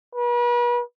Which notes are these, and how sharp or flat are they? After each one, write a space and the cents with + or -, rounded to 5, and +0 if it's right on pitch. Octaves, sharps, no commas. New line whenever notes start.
B4 -40